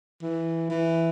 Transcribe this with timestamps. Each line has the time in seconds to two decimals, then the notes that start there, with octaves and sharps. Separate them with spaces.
0.22 E3
0.70 E3